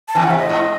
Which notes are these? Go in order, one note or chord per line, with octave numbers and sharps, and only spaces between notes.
A5
E2 E3 G#5
F#5
C3
E5
A2 D#5
G#2